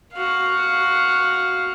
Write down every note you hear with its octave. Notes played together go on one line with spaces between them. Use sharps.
F#4 F5